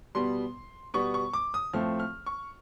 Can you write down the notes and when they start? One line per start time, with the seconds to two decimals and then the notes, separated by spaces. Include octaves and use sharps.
0.15 B2 G3 B3 C6
0.94 B2 G3 B3 C#6
1.14 C#6
1.33 D6
1.54 D#6
1.73 A2 F3 A3 C4 F6
2.00 F6
2.26 C#6